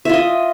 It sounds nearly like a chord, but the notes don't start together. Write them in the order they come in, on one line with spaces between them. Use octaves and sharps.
E5 F4 D#5